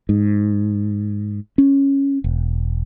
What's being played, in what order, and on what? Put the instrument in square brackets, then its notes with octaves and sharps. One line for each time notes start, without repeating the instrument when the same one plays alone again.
[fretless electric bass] G#2
C#4
E1